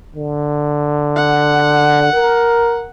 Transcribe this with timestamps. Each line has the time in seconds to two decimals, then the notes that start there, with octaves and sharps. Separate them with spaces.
0.16 D3
1.16 F#5
2.13 A#4